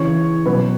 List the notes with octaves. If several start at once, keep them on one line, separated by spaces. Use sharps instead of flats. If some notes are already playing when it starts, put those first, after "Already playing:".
Already playing: C#3 E3 C#5
B2 F#3 B4